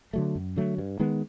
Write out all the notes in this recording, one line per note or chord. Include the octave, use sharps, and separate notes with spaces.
D3 F#3 A3
F#2
D3 F#3 A3
G2
D#3 G#3 B3